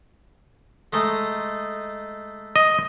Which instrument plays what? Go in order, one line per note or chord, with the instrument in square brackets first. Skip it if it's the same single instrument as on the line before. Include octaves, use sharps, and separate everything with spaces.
[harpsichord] G#3 A3 D#4
[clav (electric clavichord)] D#5